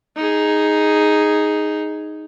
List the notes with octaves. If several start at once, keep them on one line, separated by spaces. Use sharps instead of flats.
D#4 G#4